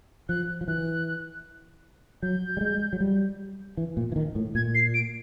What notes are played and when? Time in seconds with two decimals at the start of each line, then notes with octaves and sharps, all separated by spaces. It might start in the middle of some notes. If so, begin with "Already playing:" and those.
0.29 F3 F#6
0.61 F3
0.68 E3 F#6
2.23 F#3 G6
2.57 G3
2.61 G#3
2.93 F#3
3.00 G3
3.77 E3
3.97 A#2
4.12 E3
4.16 D#3
4.35 A2
4.55 A#2 G#6
4.75 C7
4.94 D7